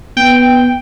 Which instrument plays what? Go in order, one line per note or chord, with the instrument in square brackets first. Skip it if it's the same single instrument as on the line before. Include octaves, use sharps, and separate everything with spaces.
[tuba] B3 [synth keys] G5